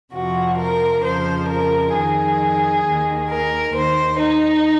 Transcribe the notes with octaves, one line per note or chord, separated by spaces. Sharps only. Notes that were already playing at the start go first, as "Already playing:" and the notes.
F2 C3 F3 F#4
A#4
F2 C#3 F3 C5
A#4
F2 D#3 G#4
D#2 D#3
A#4
D#2 D#3 C5
D#4